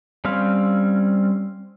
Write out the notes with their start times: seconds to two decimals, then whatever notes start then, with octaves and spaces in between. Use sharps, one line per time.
0.25 G3 C4 C#4 F5